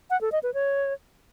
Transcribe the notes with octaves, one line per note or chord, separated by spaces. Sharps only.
F#5
A4
D#5
B4
C#5